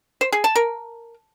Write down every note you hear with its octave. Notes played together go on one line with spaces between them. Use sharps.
C5
G#4
A5
A#4